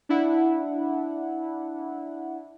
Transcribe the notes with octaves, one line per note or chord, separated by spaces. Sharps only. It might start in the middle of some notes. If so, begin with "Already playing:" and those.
D4 E4 F#5